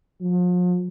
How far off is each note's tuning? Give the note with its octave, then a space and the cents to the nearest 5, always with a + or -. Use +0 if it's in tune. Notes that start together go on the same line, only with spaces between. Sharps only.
F3 +40